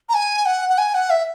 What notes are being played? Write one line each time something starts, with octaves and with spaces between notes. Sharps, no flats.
A#5
G#5
F#5
F#5
G#5
F#5
E5